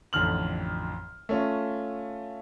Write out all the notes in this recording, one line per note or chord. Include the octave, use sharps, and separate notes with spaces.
A1 F2 D3 F6 F#7
A3 C#4 F4